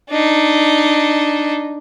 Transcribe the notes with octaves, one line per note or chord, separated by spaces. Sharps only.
D4 D#4